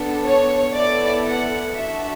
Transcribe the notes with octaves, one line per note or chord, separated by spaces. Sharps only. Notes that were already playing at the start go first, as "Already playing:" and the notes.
Already playing: B3 D4 A4
C#5
B3 E4 A4 D5
F#5
D4 F#4 A4 E5